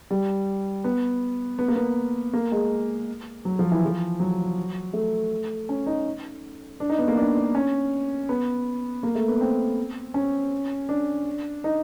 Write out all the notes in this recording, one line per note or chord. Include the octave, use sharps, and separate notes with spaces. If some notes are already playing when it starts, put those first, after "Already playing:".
G3
B3
B3
A#3
B3
A#3
G#3
F#3
F3
E3
F3
F#3
A3
C#4
D#4
D4
D#4
B3
A#3
D4
D4
C#4
B3
A#3
A3
B3
C4
C#4
D4
D#4